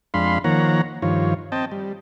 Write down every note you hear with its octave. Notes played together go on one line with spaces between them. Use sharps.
F2 G#3 D4 F5 B5 C6
D#3 F3 A#3 C#5 F#5 A#5
G2 D#3 F3 F4 C#5
C4 D#5 G5 A5
G3